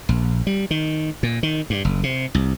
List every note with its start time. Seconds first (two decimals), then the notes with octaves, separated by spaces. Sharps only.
0.09 A#1
0.47 G3
0.71 D#3
1.23 A#2
1.43 D#3
1.70 G2
1.85 F#1
2.03 C3
2.35 C2